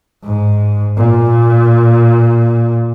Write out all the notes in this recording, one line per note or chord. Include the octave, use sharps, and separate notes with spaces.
G#2
A#2